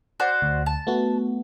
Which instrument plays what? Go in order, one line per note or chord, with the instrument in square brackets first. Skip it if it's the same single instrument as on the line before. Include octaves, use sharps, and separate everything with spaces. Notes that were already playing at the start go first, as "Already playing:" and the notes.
[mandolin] F#4 C5 D5
[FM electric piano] D2
[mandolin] A5
[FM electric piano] A3 B3 F#4